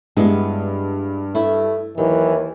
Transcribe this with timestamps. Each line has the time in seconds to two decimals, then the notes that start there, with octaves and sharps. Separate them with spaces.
0.17 G2 G#3 B3 E4
1.35 A3 E4
1.98 D#2 E3 F#3